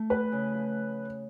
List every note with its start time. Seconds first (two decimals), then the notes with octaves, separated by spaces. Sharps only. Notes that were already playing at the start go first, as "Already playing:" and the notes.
Already playing: A3
0.10 E2 B4
0.32 C#3
0.54 F3